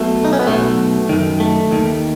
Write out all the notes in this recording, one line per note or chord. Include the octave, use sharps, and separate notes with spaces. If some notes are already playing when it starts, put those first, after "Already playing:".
Already playing: B1 B2 A3
D#4
C#4
B3
B1 B2 A3
F#2 D#3
A3
D#2 D#3